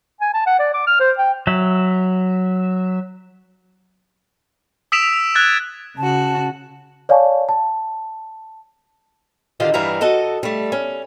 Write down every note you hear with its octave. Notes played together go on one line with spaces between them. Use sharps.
G#5
A5
F#5
D5
D6
F6
C5
G5
F#3 E5
D#6 E6 B6 D7 E7 F7
F#6 G#6 A6
C#3 F#4 A5
C#5 D5 F5 G#5 A5 C#6
A5
D3 D#3 F4 G4 D5 D#5
G2 E3 G3 E4 F5 A#5
F#4 A4 D#5
G3 A3
C#4